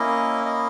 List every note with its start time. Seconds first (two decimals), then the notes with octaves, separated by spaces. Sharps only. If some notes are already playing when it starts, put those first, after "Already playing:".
Already playing: A#3 C#4 E4 D#5
0.45 D#5